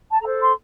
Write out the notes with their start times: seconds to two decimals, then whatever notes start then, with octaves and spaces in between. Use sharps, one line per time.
0.10 A5
0.20 A4 C5 A#5
0.42 C6